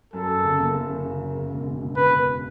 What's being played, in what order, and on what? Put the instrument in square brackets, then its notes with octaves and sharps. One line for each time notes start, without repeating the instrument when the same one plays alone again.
[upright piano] F#2 [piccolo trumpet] A4
[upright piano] F#2
C#3
F#1
F#1
C#3
C#3
C#3
C#3
E1
C#3
E1
[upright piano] C#3 [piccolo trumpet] B4
[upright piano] E1